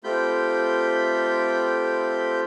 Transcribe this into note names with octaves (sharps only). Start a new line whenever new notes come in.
A3 C4 F4 G4 B5 G6